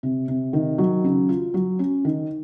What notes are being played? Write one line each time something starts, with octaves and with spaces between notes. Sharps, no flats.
C3
C3
D#3
F#3
C#3
F4
F#3
C#4
D#3